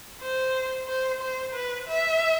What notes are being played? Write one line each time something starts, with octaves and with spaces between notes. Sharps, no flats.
C5
C5
C5
B4
E5